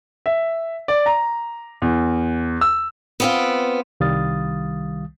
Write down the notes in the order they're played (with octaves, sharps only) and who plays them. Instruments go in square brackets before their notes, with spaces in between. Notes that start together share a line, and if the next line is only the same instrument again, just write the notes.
[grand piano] E5
D5
A#5
E2
E6
[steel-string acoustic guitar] B3 C4 F4
[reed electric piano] C2 D#3 G3 F5 D#6 A6